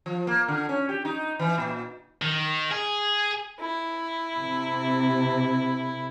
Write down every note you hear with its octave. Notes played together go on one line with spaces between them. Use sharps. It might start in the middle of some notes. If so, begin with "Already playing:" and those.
F3
A#3
D3
C#4
G4
D#4
E3
A#2
D#3
G#4
E4
C3